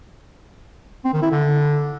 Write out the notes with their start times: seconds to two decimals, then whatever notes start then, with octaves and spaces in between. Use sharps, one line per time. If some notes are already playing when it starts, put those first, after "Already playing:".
1.04 C4
1.13 D#3
1.22 E4
1.31 D3